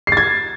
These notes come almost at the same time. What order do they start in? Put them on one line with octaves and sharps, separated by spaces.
C7 A6 G#6